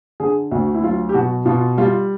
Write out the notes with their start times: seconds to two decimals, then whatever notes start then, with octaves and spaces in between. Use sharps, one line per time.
0.20 D3 G#4
0.51 D2 F#4
0.74 E4
0.83 F#3 F4
1.09 G4
1.14 B2 F#4
1.45 B2 F4
1.78 G3 F4